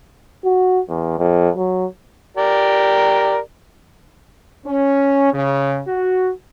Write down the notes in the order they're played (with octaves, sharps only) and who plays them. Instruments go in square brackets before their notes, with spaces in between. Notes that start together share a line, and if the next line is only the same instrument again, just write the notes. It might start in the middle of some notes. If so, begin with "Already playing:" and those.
[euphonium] F#4
E2
F2
F#3
[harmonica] G4 A#4 D5
[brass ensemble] C#4
C#3
F#4